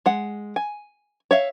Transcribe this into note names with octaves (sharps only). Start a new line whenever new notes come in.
G#3 F#5
G#5
C#5 E5 F5